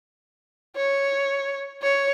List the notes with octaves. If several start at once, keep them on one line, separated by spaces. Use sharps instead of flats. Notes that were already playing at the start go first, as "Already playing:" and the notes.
C#5
C#5